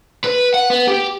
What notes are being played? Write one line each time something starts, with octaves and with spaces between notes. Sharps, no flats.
B4
F#5
B3
G4